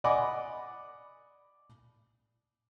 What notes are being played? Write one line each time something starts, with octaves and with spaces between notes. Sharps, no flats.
D5 D#5 F#5 G#5 B5 D6